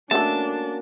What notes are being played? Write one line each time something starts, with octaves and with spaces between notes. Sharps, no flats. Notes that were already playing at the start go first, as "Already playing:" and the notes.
A3 A#3 C#4 D4 F#4 A4 A5